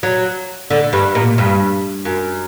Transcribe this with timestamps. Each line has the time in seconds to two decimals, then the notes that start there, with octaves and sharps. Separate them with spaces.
0.03 F#3
0.70 D3
0.93 G2
1.15 A#2
1.38 G2
2.05 F#2